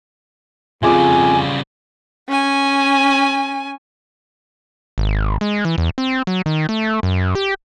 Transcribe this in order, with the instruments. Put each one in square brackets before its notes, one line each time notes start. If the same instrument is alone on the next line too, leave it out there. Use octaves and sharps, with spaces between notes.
[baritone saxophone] F2 [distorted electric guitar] C#3 G3 [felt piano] F4 G#4 D6 [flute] G#5
[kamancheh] C#4 G#5
[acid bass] G#1
G#3
E3
E2
C4
F#3
D#3
A3
F#2
G4